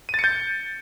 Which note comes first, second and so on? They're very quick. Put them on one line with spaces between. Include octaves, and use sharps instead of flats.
D#7 A6 C#7 G6